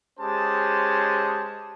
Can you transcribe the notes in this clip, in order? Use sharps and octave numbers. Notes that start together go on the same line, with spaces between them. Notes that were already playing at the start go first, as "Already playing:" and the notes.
G#3 C#4 G4 G#4 C5 A5